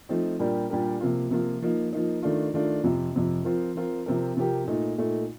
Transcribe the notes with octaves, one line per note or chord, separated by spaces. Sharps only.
F3 A3 C4 D#4
A#2 G3 D4 G4 A#4
A#2 G3 D4 G4 A#4
C3 F3 A#3 F4
C3 F3 A#3 F4
F3 A#3 D#4
F3 A#3 D#4
D#3 A3 D4 F4
D#3 A3 D4 F4
F2 C3 F3
F2 C3 F3
F3 C4 F4 A#4
F3 C4 F4 A#4
C3 F3 C4 G4 A#4
C3 F3 C4 G4 A#4
A#2 A3 D#4
A#2 A3 D#4